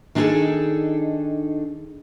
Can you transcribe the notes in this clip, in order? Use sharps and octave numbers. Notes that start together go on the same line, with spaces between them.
D#3 D4 D#4 F#4 G#4 A4